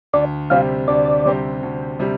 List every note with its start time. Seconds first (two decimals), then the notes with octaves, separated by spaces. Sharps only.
0.13 D2 D5
0.50 C3 G3 C4 G4 F5
0.88 D2 D5
1.26 C3 G3 C4 G4
1.63 D2
2.00 C3 G3